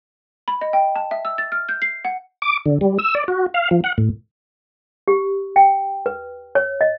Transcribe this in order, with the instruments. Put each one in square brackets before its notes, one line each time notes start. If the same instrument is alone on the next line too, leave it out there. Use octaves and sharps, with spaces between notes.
[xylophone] B5
D#5
G5
A5
E5
E6
A6
F6
G6
C7
F#5
[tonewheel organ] D6
D3
G3
E6
D5
F#4
F5
F3
F#5
A2
[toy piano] G4
G5
B4
C#5
D#5